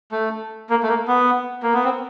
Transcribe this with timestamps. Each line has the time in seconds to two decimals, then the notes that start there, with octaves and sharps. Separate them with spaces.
0.12 A3
0.70 A#3
0.83 A3
0.88 A#3
1.07 B3
1.63 A#3
1.74 B3
1.84 C4